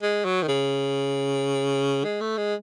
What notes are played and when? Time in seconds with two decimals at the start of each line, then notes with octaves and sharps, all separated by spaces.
0.02 G#3
0.25 F#3
0.43 D#3
0.48 C#3
2.04 G#3
2.21 A3
2.37 G#3